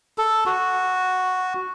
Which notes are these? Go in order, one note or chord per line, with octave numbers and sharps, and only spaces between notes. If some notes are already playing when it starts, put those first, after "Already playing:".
A4
F#4